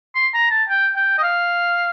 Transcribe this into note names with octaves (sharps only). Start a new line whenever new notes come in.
C6
A#5
A5
G5
G5
D#5
F5